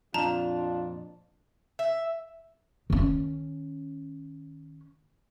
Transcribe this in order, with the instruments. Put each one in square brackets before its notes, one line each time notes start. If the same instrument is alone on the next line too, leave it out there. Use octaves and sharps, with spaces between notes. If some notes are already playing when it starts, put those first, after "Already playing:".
[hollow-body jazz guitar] F2 A#2 [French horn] D4 [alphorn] F4 [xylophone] A5 A#5
[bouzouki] E5
[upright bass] D#3 C#4